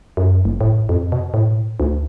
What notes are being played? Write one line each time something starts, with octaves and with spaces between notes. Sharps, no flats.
F#2
F#1
A2
F2
B2
A2
D2